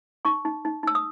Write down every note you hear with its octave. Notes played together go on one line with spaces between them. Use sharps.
D#4 C#6
D#4
D#4
D#4 E6
D#6